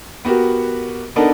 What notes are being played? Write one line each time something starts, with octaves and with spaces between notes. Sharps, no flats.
B3 F#4 G4 A#4
B3 D4 D#4 A4 A#4